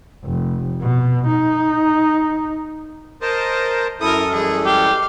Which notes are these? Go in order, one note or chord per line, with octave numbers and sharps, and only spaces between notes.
F1
B2
D#4
A#4 C5 D#5 A5
F#2 E4 A4 A#4 D#6
E3 G3 G#3 G#4
G4 F5